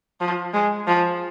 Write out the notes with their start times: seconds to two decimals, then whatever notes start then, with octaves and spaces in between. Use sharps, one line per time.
0.21 F3
0.54 G#3
0.87 F3